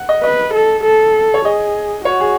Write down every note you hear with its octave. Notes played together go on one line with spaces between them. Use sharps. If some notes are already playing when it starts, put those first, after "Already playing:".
Already playing: F#5
D#5
B4 D#5
A4
A4
C#5
G#4 D#5
F#4 C#5
G#4